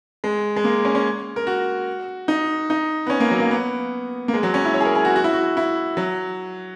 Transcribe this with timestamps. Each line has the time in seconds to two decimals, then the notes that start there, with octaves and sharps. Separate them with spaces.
0.24 G#3
0.56 G#3
0.64 A#3
0.85 C#4
0.95 C#4
1.36 A#4
1.47 F#4
2.28 D#4
2.70 D#4
3.06 B3
3.10 C#4
3.20 A#3
3.31 F#3
3.40 A#3
3.51 B3
4.28 A#3
4.34 G#3
4.43 F#3
4.54 C#4
4.65 E4
4.74 C#5
4.80 G#4
4.85 A#4
4.95 G#4
5.05 F#4
5.16 F#4
5.24 E4
5.33 F#4
5.57 E4
5.97 F#3